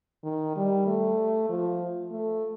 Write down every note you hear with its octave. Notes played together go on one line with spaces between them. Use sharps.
D#3
G3
A3
F3
A3